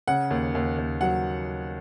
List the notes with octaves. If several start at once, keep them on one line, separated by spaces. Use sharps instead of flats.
C#3 F#5
D#2
D#2
D#2
F#3 F#5